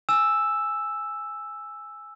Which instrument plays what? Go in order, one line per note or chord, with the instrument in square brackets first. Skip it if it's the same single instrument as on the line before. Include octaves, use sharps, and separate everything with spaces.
[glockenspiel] G#5 E6 E7